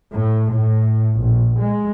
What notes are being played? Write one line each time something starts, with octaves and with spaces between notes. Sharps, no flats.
A2
A2
A#1
G#3